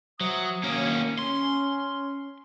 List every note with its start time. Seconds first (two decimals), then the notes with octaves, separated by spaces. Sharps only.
0.21 F#3 C5 E5 D#6
0.63 F#2 D#3 A#3 C#4 C#5
1.19 C#4 C6